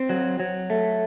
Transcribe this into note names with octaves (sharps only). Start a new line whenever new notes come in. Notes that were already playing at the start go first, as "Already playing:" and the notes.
Already playing: C4
F#3
F#3
A3